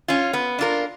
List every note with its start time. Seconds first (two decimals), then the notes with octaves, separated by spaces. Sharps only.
0.08 C#4 F4
0.33 B3
0.59 D4 F4 A#4